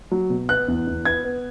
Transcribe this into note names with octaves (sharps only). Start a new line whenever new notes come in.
F#3
B2
B3 F#6
E2
E2
B3 G#6
B3